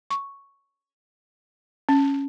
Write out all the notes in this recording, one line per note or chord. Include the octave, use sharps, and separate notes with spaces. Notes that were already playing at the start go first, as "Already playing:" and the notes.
C#6
C#4